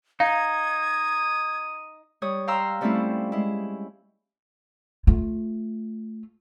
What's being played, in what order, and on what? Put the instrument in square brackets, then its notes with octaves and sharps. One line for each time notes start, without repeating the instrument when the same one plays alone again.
[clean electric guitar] D#4 [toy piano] F5 [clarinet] D#6 [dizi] G#6
[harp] G3 C#5 D#6
F5 G5 A#5 C6 E6 F6
F3 G3 A3 C4 C#4 E4
G#3 E4
[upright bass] A3 F4